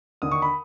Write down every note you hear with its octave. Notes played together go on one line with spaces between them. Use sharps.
D#2 D3 D#6
C#6
B5